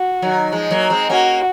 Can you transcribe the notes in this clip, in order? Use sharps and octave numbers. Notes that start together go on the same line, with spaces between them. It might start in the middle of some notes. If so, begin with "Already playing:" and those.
Already playing: F#4
D#3 F#3
F3 G#3
F#3 A#3
G#3 C4
A#3 C#4 F#4